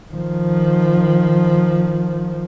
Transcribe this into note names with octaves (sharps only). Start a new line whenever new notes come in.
D#3 F3